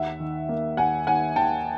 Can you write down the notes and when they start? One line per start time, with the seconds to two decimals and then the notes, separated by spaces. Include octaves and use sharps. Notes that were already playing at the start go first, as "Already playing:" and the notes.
Already playing: D#2 E5 F#5
0.20 D#3
0.49 A#3
0.77 D#2 F#5 G#5
1.07 D#2 F#5 G#5
1.36 D#2 G5 A5